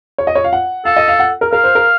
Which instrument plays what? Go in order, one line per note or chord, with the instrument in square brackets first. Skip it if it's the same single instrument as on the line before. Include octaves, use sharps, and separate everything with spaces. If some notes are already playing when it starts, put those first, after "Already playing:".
[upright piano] C#5
D#5
C#5
F5
F#5
[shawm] A4 [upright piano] F5
[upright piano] D#5
F5
F#5
A#4
[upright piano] A#4 [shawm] F5
[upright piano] C5
A#4